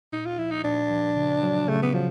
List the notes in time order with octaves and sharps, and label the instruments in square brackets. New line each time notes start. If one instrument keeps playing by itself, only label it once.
[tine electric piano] A#2 [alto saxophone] D#4
[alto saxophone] F4
[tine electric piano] F3 [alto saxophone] E4
[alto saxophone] D#4
[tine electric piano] A#2 [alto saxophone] D4
[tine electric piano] F3
C#3
F#3
[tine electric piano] C#3 [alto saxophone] A3
[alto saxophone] B3
[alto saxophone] F3 [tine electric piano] F#3